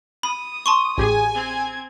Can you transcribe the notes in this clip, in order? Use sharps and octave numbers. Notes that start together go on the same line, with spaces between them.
B5 D#6
A5 C6 C#6
A1 G4 G#4 G#5
C4 G#6